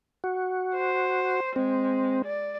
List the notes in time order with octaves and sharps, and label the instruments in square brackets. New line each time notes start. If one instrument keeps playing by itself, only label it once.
[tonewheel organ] F#4
[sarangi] C5
[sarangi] G#3 [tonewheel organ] C4
[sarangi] D5